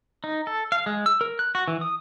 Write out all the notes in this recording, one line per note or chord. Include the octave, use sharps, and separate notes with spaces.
D#4
A4
F5
G#3
E6
A#4
F#6
F#4
E3
D#6